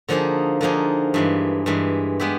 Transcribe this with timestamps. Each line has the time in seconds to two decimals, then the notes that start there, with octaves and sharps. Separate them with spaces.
0.08 D3 F3 A#3 D#4 G#4
0.61 D3 F3 A#3 D#4 G#4
1.14 G2 E3 G#3
1.66 G2 E3 G#3
2.20 G#3 B3 E4 G4